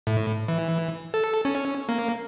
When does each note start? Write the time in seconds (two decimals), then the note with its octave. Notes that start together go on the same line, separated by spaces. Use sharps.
0.07 A2
0.48 E3
1.14 A4
1.45 C#4
1.89 A#3